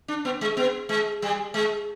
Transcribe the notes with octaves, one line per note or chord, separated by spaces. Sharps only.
D4
B3
G#3
B3
G#3
G3
G#3